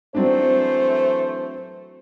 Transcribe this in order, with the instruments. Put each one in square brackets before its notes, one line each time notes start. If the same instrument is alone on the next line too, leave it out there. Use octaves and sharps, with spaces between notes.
[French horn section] E3 A3 C5 [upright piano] F#3 C4 D4